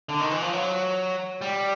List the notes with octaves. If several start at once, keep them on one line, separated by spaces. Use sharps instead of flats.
D3
D#3
E3
F3
F#3
G3